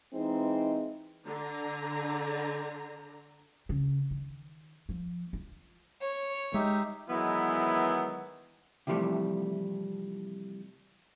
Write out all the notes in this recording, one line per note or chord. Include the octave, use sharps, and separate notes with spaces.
E3 G#3 C4 D#4
D3 A#5
C#3
D#3
F3
F4
C#5
G#3 D#4 G4 E5
D#3 E3 F#3 G#3 B3 E4
C3 E3 F3 G3 A3